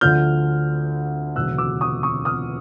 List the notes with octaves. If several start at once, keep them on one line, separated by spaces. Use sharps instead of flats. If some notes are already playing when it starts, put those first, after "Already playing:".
D2 D3 F3 F6 G6
E1 D2 C#3 F#3 E6 F#6
D6 E6
C#6 D#6
C#6 D#6
D#6 F6